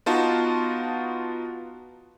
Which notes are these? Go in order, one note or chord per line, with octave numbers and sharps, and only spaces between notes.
B3 D#4 F4 F#4 A5